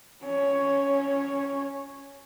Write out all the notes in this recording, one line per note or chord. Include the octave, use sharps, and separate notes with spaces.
C#4 C#5